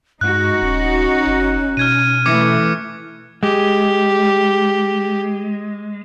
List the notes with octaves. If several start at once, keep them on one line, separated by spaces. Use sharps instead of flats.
G2 G#3 D#4 F#4 F#6
D#1 C#4
F#1
B2 F6 G#6 D#7
E3 A3 D6 G#6 C#7
G#3 G4